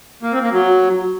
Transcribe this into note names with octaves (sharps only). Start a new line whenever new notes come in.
A#3
C4
A#3
F#3